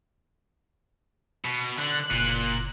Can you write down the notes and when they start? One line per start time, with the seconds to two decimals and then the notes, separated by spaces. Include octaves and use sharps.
1.45 B2
1.78 D3 F#6
2.11 F#1 A#2